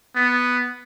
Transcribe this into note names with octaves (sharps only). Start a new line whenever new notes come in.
B3